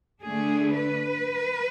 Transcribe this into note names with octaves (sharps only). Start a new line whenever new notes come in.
D3 A3 D4 G#4
B4